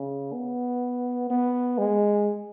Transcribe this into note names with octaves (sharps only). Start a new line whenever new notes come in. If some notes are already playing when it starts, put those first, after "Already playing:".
Already playing: C#3
B3
B3
G#3